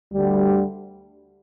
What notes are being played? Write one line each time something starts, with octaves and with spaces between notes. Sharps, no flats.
D2 D3 G3